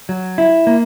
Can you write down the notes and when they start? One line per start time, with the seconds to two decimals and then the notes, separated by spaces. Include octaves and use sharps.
0.09 F#3
0.38 E4
0.67 A#3